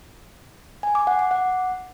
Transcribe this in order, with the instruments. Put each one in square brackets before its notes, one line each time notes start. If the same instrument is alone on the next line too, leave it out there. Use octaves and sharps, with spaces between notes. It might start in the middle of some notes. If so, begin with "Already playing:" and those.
[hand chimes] G#5
D6
F#5
D6
F#5